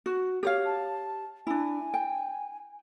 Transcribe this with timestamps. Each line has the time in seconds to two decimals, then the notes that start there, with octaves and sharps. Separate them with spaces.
0.06 F#4
0.43 G4 C#5 F5
0.66 A5
1.47 D4 E4 G#5
1.94 G5